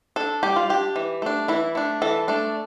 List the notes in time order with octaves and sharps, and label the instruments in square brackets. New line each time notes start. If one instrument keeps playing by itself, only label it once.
[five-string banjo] D4 A4
G3 G4
F4
D4 G4
E3
A3 D4
E3 E4
A3 D4
E3 A4
A3 D4